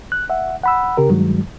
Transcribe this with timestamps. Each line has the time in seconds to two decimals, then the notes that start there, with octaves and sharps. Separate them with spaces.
0.12 F#6
0.30 E5 F#5
0.64 F#5 B5 E6
0.97 C#3 G4 A#4
1.09 G2 D#3 F#3 G#3